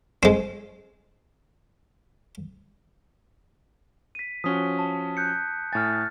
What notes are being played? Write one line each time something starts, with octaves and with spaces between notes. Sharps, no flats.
G#3 C4
B6 D#7
F3 C#4 F#4 D#6 B6 G7
A5
F#6 G6 C#7
A2 G#5 F6 A6